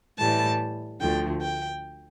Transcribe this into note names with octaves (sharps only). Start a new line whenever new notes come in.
A2 E3 G3 A5
D2 D3 F3 A3 G5
G5